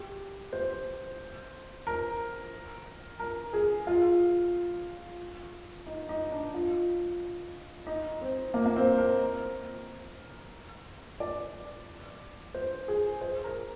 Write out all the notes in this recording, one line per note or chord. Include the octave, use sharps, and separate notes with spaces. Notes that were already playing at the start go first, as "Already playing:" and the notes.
Already playing: G4
C5
A#4
A#4
G#4
F4
D#4
D#4
D4
F4
D#4
C4
A#3
A#3
C4
A#4
D5
C5
G#4
C5
A#4